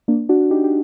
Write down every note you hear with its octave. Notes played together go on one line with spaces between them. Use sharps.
A#3 D4
D4 F#4
D#4 G4
G4